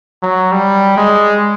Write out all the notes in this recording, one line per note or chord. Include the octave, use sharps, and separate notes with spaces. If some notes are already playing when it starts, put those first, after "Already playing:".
F#3
G3
G#3